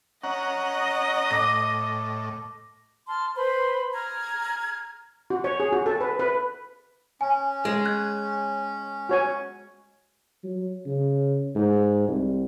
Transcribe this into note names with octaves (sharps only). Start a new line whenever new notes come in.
C#4 D#5 F#5 A#5
A2 D6 A#6
A5 C6 F6
B4 C5 B5 C6
A#5 F6 G#6
F#4
C#5
G#4
F#4
A4
B4
B4
C#4 G#5
G#3
F#6 G#6
F#4 C#5 G#5
F#3
C#3
G#2
C2